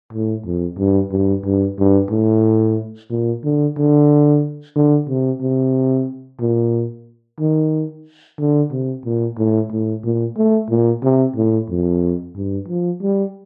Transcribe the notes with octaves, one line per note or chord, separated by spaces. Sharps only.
A2
F2
G2
G2
G2
G2
A2
A#2
D3
D3
D3
C3
C3
A#2
D#3
D3
C3
A#2
A2
A2
A#2
A3
A#2
C3
A2
F2
G2
F3
G3